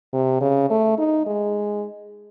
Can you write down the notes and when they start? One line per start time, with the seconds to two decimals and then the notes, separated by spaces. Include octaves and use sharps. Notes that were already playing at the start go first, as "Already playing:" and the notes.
0.13 C3
0.41 C#3
0.70 A3
0.98 D#4
1.26 G#3